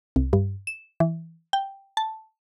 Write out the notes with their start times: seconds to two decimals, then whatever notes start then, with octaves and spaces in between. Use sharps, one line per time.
0.16 C2
0.33 G2
0.67 E7
1.00 E3
1.53 G5
1.97 A5